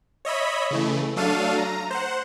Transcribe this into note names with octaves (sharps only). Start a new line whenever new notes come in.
C#5 D#5 E5 B5
C#3 E3 A3
F#3 A3 D4 A4 F5 D#7
A#5
C5 F#5